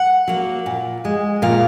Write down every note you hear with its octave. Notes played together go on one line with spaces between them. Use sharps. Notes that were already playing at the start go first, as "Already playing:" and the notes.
Already playing: F#5
F#3 A#3
A#2
G#3
A#2 F5